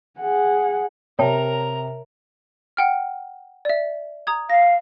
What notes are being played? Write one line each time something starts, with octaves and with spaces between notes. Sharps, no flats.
G#4 F#5
C3 A#4 C#5 G5 A5 A#5
F#5 G5 F6
D5 E5
A#5 D#6 G#6
F5 A#6